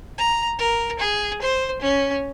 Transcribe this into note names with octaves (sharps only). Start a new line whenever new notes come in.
A#5
A#4
G#4
C5
C#4